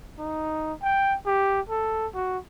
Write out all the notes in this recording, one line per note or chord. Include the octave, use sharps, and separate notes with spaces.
D#4
G5
G4
A4
F#4